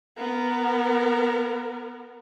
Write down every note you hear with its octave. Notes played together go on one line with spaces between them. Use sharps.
B3 A#4